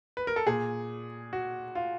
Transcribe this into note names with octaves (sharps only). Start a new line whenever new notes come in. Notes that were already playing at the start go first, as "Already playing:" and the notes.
B4
A#4
A4
A#2 G#4
F#4
F4